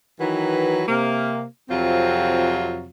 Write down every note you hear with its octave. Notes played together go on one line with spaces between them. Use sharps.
D#3 E3 F#3 F#4 B4
C3 A#3
F2 C3 F#3 C4 F4